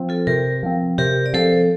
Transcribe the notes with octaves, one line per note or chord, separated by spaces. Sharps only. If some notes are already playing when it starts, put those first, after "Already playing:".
Already playing: F3 C4
F4 A4
C3 G4 A#4
F3 C4
C3 G4 A#4
D5
F3 C4 A4 C5